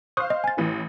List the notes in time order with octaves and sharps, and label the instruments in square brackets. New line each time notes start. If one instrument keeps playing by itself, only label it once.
[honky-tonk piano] C5 F5 [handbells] C#6 D#6 F#6
[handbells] D#5
G#5 A6
[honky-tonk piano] A1 E3